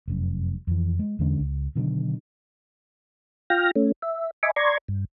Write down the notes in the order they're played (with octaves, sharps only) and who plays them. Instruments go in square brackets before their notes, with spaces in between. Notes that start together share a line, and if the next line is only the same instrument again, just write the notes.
[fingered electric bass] F1 F#2
F2 E3
G#3
E2 D3 G#3 C#4
C#2
B2 D3 D#3 F#3
[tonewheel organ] F4 G5 F6 A#6
A3 C#4
E5
D#5 E5 G#5 B5 C#6 D6
D5 A#5 C6 C#6 G#6
G2